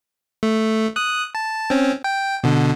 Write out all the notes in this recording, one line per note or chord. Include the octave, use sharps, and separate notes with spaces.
A3
D#6 F#6
A5
C4 C#4
G5
B2 D3